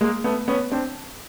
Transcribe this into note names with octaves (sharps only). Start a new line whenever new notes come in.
G#3 A#3
A3 B3
B3 C#4
C4 D4